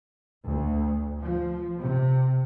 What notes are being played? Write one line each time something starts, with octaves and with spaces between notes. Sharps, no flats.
D2
F3
C3